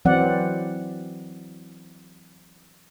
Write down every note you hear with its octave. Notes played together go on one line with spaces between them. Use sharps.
E3 F#3 C4 D5 F#5